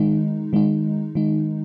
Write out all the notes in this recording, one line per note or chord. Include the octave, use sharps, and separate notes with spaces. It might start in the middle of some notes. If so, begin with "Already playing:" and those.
Already playing: D#3 G#3 D#4
D#3 G#3 D#4
D#3 G#3 D#4